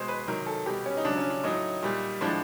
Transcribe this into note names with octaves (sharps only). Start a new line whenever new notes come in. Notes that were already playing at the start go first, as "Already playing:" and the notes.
Already playing: B2 G#3 C5
B4
C3 D#3 F#3 A#4
A4
B2 G3 G4
C#4
D#4
C#3 D4
F#3
C#4
D4
A2 F#3 D#4
A#2 G3
A2 F3 G#3 D4